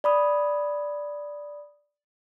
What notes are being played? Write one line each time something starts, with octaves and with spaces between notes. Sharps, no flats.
D5 B5 D#6